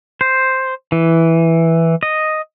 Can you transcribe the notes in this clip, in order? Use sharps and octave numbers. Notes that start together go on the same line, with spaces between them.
C5
E3
D#5